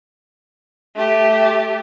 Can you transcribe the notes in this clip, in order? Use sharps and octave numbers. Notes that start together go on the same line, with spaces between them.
A3 G4